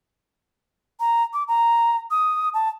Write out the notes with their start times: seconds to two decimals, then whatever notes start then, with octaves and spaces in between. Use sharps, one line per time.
1.00 A#5
1.33 D6
1.48 A#5
2.11 D#6
2.54 A5